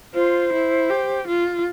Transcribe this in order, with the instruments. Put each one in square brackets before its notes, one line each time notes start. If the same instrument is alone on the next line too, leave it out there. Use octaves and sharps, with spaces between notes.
[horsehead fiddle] F4 [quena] C5
[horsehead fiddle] E4
G4
F4